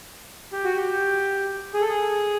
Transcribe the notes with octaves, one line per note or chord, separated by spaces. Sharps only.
G4
F#4
G4
G#4
A4
G#4